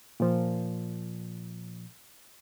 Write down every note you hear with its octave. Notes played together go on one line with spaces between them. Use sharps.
A#2 F3